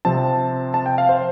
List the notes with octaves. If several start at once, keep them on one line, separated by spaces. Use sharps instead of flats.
C3 F3 C4 A5
A5
G5
F5
C5